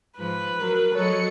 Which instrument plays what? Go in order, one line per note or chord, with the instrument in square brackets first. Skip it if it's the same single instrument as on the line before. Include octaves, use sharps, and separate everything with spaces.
[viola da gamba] G#2 F3 [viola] B4
[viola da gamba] F#3 [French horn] A#4
[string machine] F#3 C#7 [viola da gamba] A4 D#5 [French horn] C#5